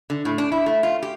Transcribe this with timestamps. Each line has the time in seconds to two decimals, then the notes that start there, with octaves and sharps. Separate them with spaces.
0.10 D3
0.25 A2
0.38 D4
0.52 E4
0.66 A3
0.83 F4
1.03 G4